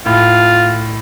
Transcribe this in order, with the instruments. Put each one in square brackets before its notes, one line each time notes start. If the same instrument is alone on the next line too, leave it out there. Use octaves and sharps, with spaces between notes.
[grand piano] A2 [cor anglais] F4